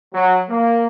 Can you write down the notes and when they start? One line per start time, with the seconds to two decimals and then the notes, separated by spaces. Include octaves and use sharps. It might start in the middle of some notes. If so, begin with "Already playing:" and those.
0.14 F#3
0.50 A#3